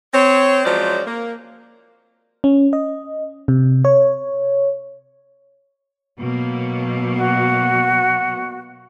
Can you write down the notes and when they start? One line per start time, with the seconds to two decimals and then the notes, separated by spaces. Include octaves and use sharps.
0.14 C4 C#5
0.65 F3 F#3 G#3 C#4 C5 D5
1.06 A#3
2.44 C#4
2.73 D#5
3.48 C3
3.85 C#5
6.19 B2 F#3 A#3
7.15 F#4